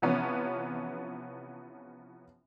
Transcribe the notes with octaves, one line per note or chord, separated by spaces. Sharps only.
C3 E3 F3 B3 C#4